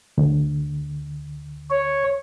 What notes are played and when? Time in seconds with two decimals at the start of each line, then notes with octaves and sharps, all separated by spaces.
0.18 D2
1.70 C#5